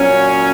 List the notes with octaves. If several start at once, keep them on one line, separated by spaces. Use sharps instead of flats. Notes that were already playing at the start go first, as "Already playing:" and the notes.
Already playing: A#2 F#3 C#4